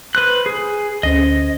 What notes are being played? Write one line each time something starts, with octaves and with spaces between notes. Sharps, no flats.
B4 C5 F#6
G#4
D2 C#4 C5 D#5